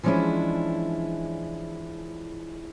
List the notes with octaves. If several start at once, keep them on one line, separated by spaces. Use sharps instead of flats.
E3 F3 G#3 C#4 D4 E4